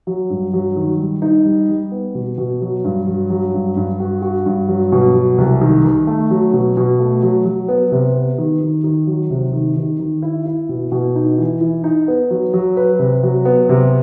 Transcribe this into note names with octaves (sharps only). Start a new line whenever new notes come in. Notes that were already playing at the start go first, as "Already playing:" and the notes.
F#3
G2
F#3
D#3
G3
D#4
G3
G3
B3
B2
B2
F#3
G2
F#3
F#3
G2
G2
F#4
F#4
G2
F#3
B2
F#3
C2
D#3
D#3
A3
F#3
B2
B2
A3
F#3
F#3
B3
C3
B3
D#3
D#3
D#3
F#3
C3
D#3
D#3
D#3
E4
E4
B2
B2
D#4
E3
E3
D#4
B3
F#3
F#3
B4
C3
F#3
B3
C3